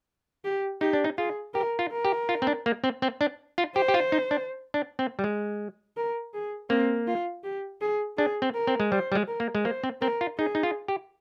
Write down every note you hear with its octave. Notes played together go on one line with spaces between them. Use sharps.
G4
D#4 G4
D4
D#4
F4 G#4
G4 A#4
F4
A#4
G4
F4
C4
D4
A#3
C4
C4
D4
F4
G4 C5
G4
F4
D#4
D4
D4
C4
G3
G#3
A#4
G#4
A#3 C4
F4
G4
G#4
D4 G#4
C4
A#4
C4
G#3
G3 C5
G3
G#3
A#4
A#3
G#3
A#3 C5
C4
C4 A#4
F4
D#4 G#4
D#4
F4
G4